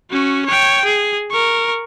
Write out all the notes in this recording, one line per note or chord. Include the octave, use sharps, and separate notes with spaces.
C#4 F#4
C#5 G5
G#4
A#4 C#6